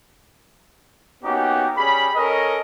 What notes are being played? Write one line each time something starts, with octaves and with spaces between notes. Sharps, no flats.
A#3 B3 C#4 D#4 F#4 G4
G3 C#4 G#4 B5
C#4 A4 A#4 C#5 D#5